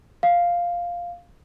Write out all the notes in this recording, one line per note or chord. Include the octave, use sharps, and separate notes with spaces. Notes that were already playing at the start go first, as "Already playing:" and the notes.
F5